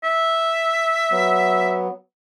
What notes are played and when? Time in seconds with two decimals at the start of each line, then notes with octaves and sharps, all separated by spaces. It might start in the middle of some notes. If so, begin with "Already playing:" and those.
0.04 E5
1.11 F#3 B3